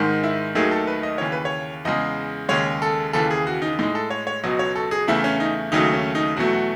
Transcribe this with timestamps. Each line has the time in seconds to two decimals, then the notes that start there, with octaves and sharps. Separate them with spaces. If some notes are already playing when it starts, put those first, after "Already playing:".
Already playing: G#2 D#3 G#3
0.23 E4
0.55 D#2 D#3 F#3 A3 G#4
0.71 A4
0.87 B4
1.03 D#5
1.18 D#2 C#3 E3 C#5
1.32 B4
1.45 C#5
1.85 E2 C#3 G#3 D#5
2.49 D#2 C#3 G#3 C#5
2.82 A4
3.13 D#2 C#3 E3 A4
3.31 G#4
3.47 F#4
3.62 D#4
3.79 A2 G#3 D#4
3.95 A4
4.10 C#5
4.27 C#5
4.44 C#2 B2 F#3 D#5
4.59 C#5
4.75 A4
4.91 G#4
5.07 E2 C#3 E3 A3 E4
5.24 C#4
5.40 D#4
5.72 D#2 C#3 F#3 A3 D#4
5.93 C#4
6.15 D#4
6.37 E2 B2 F#3 A3 F#4
6.53 F#4